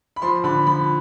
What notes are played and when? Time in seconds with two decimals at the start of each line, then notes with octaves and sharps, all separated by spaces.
0.16 B5
0.22 F3 C6
0.44 D3 B5
0.67 F3 B5